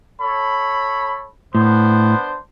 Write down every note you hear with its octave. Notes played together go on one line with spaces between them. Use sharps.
A4 C#5 B5
A2 B3 D4 C5